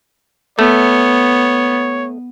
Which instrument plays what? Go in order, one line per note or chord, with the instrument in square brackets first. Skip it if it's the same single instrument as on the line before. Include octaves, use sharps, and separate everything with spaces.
[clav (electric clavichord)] A3 [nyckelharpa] B3 [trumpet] C#5